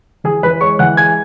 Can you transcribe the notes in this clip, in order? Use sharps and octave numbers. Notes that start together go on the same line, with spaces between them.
E3 G#4 G#5
E3 B4 B5
G#3 C#5 C#6
E3 F#5 F#6
G#3 G#5 G#6